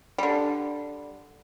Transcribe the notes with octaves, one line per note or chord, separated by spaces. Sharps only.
D3 G3